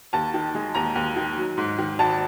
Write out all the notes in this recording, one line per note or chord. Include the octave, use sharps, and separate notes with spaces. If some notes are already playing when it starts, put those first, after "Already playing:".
D#2 A5
D#3
G#3
D#2 A#5
D#2
D#3
F#3
G#2
D#3
G#1 A5